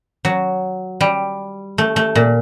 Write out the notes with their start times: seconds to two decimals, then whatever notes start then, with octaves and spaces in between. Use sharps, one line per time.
0.25 F#3
1.01 G3
1.78 A3
1.96 A3
2.15 A#2